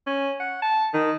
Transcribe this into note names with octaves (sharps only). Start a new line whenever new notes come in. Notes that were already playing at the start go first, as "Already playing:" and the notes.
C#4
F#5
A5
D#3